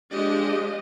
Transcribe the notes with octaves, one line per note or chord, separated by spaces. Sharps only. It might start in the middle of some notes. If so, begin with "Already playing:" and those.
F3 G#3 D4 G4 D#5